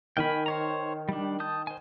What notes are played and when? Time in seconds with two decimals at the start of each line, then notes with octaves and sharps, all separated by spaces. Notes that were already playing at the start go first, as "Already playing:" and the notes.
0.17 D#3 G5 G#5 B5 F6
0.46 C5 C#5 A#5
1.09 G3 D4
1.40 A5 D#6 G6
1.67 C5 G#5